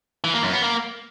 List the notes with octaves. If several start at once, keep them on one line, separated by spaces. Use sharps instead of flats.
E3
A#3
F#2
B3
A#3